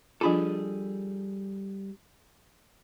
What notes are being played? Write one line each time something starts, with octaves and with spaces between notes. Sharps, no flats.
F3 G3 D4 F4 G#4 A4